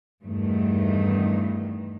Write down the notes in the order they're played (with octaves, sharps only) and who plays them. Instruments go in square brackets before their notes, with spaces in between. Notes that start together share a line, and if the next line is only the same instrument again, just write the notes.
[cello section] E2 G2 D#3 A3